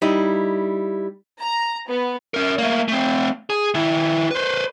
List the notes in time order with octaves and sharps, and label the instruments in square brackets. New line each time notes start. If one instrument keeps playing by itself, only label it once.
[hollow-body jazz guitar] G3 D#4 E4
[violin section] A#5
B3
[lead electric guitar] C#4 A#4
A3 A#3
A3 C4
G#4
D#3 E4
B4 C5